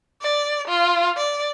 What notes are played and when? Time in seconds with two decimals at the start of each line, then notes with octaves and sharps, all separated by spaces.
0.22 D5
0.68 F4
1.17 D5